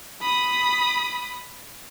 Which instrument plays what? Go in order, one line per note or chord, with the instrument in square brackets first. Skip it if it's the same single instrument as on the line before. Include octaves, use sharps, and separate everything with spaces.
[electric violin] B5 D#6